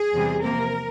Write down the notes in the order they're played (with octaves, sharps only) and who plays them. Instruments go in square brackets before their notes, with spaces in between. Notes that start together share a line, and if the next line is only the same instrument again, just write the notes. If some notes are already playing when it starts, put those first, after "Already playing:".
Already playing: [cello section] G#4
E2 C3 G3
C3 F3 A#3 A#4